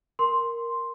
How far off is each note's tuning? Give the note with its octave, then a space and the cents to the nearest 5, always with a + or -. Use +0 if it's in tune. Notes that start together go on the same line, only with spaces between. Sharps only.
A#4 +0 C6 +0